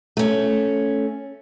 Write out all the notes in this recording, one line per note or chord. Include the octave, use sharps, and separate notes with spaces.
A3 C#4